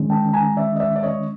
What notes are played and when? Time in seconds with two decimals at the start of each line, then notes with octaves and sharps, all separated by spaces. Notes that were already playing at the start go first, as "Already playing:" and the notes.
Already playing: D#3 G#3 C#4
0.10 G5 A5
0.33 G#5 A#5
0.57 D5 E5
0.76 D#5
0.80 D5 E5
0.96 D5
1.03 C#5 D#5